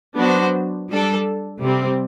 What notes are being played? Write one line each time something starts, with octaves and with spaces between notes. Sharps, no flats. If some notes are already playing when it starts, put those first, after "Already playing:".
F#3 B3 D4 F#4 C5
G3 D4 A4
C3 G3 C4